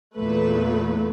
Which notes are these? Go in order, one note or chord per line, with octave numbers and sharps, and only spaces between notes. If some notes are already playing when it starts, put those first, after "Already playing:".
E2 A#2 A3 B4